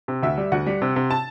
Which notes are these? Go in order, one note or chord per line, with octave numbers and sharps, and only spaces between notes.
C3
D2 E5
G3
D2 F#5
G3
C3
C3
A5